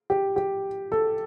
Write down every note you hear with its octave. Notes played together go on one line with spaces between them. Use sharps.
G4
G4
A4